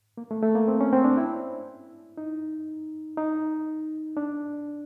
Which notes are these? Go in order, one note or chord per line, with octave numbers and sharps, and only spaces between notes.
A#3
A3
A3
A#3
C4
C#4
C4
D4
E4
D#4
D#4
D4